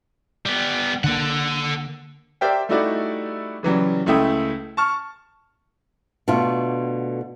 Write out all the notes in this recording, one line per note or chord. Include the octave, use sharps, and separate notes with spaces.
G3 B3
D3 A#3 A4 F#5
G4 A#4 C5 D5 E5 G5
G3 A3 D#4 E4 F#4 D5
C#3 E3 F#3 G3
C#2 A3 E4 G5 D#6
A5 C#6 F6
B2 D3 A3 F4